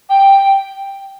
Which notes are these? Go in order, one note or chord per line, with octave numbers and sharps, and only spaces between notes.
G5